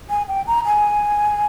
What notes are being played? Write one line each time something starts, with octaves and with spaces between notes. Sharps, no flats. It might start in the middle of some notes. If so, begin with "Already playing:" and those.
G#5
G5
A#5
G#5